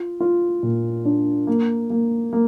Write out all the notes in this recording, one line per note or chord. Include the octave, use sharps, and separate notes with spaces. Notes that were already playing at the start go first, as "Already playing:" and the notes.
Already playing: F4
F4
A#2
D4
A#3
A#3
A#3